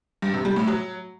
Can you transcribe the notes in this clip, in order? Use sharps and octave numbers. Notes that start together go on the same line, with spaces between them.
G2
C3
G3
A2
F#3